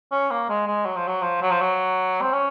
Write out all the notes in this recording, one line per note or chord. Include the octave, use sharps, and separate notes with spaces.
C#4
A#3
G#3
G#3
F#3
F3
F#3
F3
F#3
F3
F#3
C4
C#4